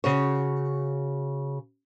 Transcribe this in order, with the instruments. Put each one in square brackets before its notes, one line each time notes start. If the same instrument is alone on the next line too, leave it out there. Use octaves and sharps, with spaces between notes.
[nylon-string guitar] C#3 F#4 C#5